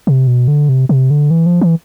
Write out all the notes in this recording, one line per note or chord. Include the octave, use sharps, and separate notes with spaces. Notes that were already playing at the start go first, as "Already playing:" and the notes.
C3
B2
D3
C3
C3
D3
E3
F3
E3